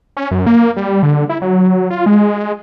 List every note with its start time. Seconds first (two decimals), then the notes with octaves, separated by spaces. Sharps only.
0.17 C#4
0.31 F#2
0.47 A#3
0.77 G3
1.03 D3
1.29 E4
1.42 F#3
1.90 F4
2.06 G#3